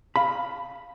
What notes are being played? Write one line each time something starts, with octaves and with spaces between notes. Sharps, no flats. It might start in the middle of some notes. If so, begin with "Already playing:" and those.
F5 B5